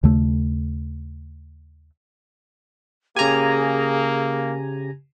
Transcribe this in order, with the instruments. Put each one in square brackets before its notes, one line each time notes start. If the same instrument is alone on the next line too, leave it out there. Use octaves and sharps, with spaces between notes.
[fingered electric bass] D#2 C#3 A3
[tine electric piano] C#3 G4 [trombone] A#3 [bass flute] G#4 [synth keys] G#5 A#5